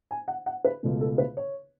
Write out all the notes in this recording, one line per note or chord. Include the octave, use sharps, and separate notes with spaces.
G#5
F#5
F#5
B4
C#2 B2 A3
A4
B4
C#5